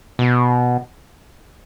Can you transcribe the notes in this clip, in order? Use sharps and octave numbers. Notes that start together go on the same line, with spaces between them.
B2